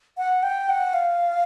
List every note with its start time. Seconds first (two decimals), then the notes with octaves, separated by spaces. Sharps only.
0.18 F#5
0.43 G5
0.69 F#5
0.94 F5